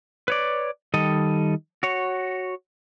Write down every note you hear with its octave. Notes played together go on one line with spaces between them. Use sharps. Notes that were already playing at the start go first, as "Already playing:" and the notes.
B4 C#5 D5
D#3 G3 A4 D#5
F#4 C#5